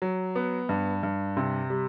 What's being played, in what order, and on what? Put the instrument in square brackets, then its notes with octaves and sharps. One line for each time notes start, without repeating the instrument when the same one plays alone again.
[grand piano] F#3
B3
G2
G2
C3
G3